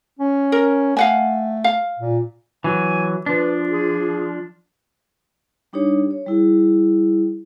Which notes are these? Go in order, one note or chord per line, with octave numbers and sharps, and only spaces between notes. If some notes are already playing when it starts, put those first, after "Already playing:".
C#4
A#4
A3 F5 F#5 G#5
F5
A#2
E3 F#3 G#5
F3 D4 B4
G#4
G3 D4 D#4 G4 C#5
C#5
G3 E4 G#4